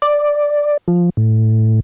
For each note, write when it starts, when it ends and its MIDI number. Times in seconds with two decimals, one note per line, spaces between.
0.02 0.77 74
0.88 1.10 53
1.17 1.80 45